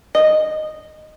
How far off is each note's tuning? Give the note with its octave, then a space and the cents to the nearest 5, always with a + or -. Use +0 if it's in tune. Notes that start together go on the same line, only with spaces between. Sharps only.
D#5 -10